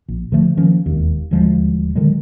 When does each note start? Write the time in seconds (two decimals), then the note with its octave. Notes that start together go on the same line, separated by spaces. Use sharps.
0.08 A#1
0.32 D3 F3 A3
0.57 D#3 F3 A#3 C#4
0.86 E1 D#2
1.31 D#1 D2 F3 G#3
1.95 D3 D#3 F#3 G#3